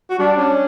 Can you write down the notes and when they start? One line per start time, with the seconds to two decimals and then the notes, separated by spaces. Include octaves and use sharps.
0.10 F#4
0.19 G3 D4
0.37 C#4